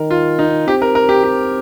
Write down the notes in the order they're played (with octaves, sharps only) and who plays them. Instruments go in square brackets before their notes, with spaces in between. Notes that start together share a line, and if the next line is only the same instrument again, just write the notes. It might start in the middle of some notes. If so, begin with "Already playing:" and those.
Already playing: [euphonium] D#3 [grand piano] A#4
[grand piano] F4
D#4
[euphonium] C4 [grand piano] G4
[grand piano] A#4
A#4
G4
G4